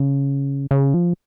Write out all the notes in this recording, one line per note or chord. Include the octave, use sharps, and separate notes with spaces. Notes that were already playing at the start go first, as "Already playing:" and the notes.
Already playing: C#3
C#3
F3